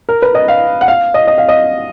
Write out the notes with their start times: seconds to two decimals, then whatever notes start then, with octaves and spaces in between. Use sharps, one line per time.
0.09 A#4
0.22 B4
0.35 D#5
0.48 F5
0.81 F#5
0.88 F5
1.14 D#5
1.27 D#5
1.38 F5
1.48 D#5